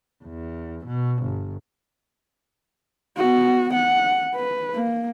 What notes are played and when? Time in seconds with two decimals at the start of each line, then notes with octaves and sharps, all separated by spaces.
0.24 E2
0.86 B2
1.23 G1
3.17 B3 F#4
3.74 F#5
4.36 B4
4.74 A#3